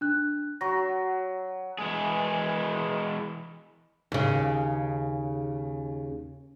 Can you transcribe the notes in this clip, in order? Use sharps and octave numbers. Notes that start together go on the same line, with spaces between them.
D4 F#6
F#3 C#6 A#6
E3 G#3 G#4
D#2 C#3